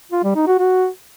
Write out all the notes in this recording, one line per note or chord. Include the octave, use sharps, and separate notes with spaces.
F4
G3
D#4
F#4
F#4